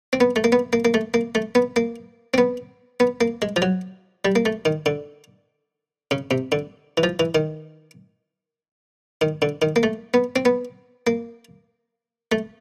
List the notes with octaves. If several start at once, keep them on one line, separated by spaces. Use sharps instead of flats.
C4
B3
A3
A#3
B3
A#3
A#3
A3
A#3
A3
B3
A#3
C4
B3
B3
A#3
G#3
F3
F#3
G3
A#3
A3
D#3
D3
C#3
C3
D3
E3
F3
E3
D#3
D#3
D3
D#3
A#3
A3
B3
C4
B3
A#3
A3